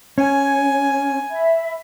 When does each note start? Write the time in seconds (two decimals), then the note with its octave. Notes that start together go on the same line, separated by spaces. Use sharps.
0.18 C#4 G#5
1.30 E5 B5